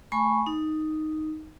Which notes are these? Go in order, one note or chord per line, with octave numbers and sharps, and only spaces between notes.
A3 G#5 B5 C#6
D#4